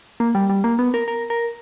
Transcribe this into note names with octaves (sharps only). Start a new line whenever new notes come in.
A#3
G3
G3
A#3
B3
A#4
A#4
A#4